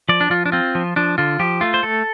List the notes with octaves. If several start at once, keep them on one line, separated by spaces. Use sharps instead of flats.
F3 D5
D4
F3 F4
D4
C4 F4
F3
F3 D4
D3 F4
F3 G4
A3 F4
C5
A3 A4